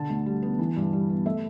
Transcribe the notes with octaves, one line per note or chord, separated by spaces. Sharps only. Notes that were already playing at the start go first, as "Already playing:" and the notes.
Already playing: D3 A5
D2
G3
B3
E3
G2
G3
B3
A3 E5